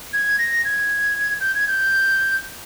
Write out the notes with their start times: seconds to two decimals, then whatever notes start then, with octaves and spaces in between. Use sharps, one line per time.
0.13 G#6
0.39 A#6
0.65 G#6
1.41 G6
1.55 G#6
1.68 G6